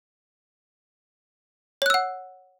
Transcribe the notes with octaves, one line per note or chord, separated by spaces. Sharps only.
C#5 F#5 E6 F#6